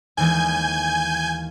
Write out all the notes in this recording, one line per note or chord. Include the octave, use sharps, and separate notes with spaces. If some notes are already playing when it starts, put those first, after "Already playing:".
D#2 E3 G#3 G#5 G6 G#6